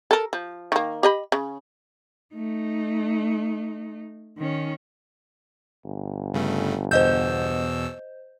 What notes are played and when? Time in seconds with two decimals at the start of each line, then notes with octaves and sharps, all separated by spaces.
0.11 A4 A#4
0.33 F3
0.72 D#3 A#3
1.03 G4 D#5 B5
1.32 C#3
2.35 A3 D#4
4.38 D#3 C#4
5.85 G1
6.34 G2 C#3 A3
6.91 E2 B2 C5 D#5 E6 G6